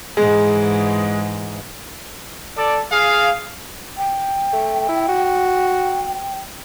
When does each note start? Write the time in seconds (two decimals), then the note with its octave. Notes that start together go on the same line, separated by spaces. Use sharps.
0.17 G#2 E3 G#3
2.57 A4 D5
2.92 G#4 F5
3.98 G5
4.53 A3
4.89 E4
5.08 F#4